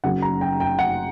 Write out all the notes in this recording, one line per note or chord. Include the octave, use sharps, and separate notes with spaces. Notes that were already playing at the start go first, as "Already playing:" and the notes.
F#1 F#2 C#3 F#3 F#5
A#5
G5
G5
F#5